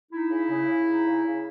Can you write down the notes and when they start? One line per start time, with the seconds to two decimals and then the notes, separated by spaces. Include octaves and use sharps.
0.11 D#4 E4
0.30 C#3
0.49 C#3
0.68 C#3
0.87 D#4
1.05 C#3
1.24 C#3